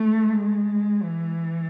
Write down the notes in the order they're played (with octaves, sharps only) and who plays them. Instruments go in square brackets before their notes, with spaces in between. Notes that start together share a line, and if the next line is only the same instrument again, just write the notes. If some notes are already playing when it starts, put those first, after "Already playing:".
Already playing: [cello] A3
G#3
E3